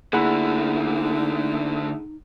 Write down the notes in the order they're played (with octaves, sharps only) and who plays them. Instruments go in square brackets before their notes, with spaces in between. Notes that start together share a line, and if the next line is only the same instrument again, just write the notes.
[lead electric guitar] D3 A3 [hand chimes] A#3 E4 [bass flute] D#4 [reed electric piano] G#4 F#5 B5